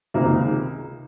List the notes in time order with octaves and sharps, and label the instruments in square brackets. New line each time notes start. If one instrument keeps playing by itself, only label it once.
[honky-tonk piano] C#2 C3 D#3 A#3 D#4